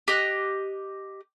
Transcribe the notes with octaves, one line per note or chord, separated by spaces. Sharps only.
G4 D#5 F#6